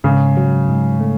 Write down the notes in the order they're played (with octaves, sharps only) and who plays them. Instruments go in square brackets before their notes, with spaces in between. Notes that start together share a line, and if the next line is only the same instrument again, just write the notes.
[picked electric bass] G#2 [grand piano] C#3
[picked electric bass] F#3
G#2
A3